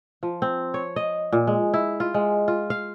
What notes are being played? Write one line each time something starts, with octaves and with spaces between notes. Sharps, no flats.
F3
C4
C#5
D#5
A#2
G#3
E4
F4
G#3
F4
F5